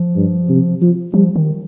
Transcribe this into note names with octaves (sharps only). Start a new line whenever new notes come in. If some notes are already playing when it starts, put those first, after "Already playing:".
Already playing: F3
G2
C3
F3
F3 G3
D#3